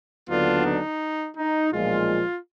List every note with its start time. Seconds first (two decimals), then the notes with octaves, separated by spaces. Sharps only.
0.28 D#2 D3 F#3 B3 D4 F4
0.64 D#4
1.36 D#4
1.72 B1 A#2 F3 G#3 F4